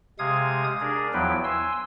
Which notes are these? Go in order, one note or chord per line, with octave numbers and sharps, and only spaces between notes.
C3 G#3 F5 D#6 G#6
D4 G#4 A#4
E2 F3 F#3 E4 B4 G5
G#5 C6 E6